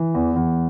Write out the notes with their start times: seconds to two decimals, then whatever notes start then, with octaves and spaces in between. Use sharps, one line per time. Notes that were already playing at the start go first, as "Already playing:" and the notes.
Already playing: E3
0.15 E2
0.36 E2